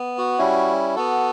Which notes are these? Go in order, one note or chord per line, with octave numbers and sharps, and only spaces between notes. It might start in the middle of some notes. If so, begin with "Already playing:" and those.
Already playing: B3
F#4
G3 C#4 E4
B3 F#4 A4